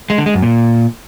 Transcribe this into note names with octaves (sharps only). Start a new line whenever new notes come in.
G#3
D3
G#3
F#2
A#2